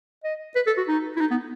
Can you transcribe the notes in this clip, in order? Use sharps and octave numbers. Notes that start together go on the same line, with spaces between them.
D#5
B4
A4
F#4
D#4
E4
D#4
B3